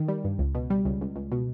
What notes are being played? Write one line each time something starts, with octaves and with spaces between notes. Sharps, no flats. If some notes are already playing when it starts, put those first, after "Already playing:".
Already playing: D#3
G3
G2
C#2
B2
G3
C#2
C#2
C#2
B2